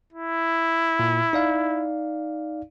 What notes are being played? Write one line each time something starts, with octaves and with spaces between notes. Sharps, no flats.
E4
A#2
D#4 D5 F5